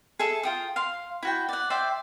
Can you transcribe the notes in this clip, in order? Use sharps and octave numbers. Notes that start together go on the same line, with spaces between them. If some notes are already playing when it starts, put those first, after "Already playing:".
G#4 A4 E5
F4 G5 D#6
F5 C6
E4 F#4 G5
D5 F#5
C5 D5 E5 G5